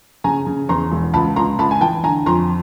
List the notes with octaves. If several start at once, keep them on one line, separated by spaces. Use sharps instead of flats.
C#3 G#5 A#5
C#3
E2 A#5 C6
E1
C#2 A5 B5
C#2 A#5 C6
C#2 A5 B5
G#5
E3 G5 A5
D3 G#5 A#5
F2 A#5 C6